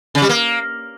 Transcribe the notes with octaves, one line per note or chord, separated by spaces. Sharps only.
C#3
G3
A#3